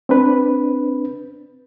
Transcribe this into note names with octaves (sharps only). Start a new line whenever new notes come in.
C4 D4 B4